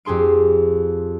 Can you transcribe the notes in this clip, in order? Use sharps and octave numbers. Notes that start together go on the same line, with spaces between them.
F2 G4 G#4 C6 D7